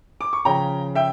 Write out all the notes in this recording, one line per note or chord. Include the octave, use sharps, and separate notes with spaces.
D6
C#6
C#3 F3 C#4 G5 A#5
E5 G5